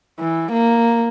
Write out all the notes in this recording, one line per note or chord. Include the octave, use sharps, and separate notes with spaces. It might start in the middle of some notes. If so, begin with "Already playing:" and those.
E3
A#3